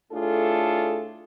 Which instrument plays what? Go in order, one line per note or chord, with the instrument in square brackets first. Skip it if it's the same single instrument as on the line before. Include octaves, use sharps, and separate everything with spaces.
[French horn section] A2 A3 D4 F4 G#4 A4